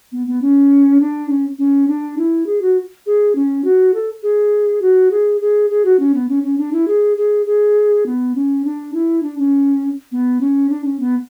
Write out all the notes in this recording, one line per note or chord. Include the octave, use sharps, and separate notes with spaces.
B3
B3
C#4
D4
C#4
C#4
D4
E4
G#4
F#4
G#4
C#4
F#4
A4
G#4
F#4
G#4
G#4
G#4
F#4
C#4
B3
C#4
C#4
D4
E4
G#4
G#4
G#4
B3
C#4
D4
E4
D4
C#4
B3
C#4
D4
C#4
B3